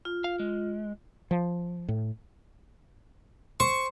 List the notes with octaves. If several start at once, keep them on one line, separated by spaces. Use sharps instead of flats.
F4
F5
G#3
F3
A2
C5 C#6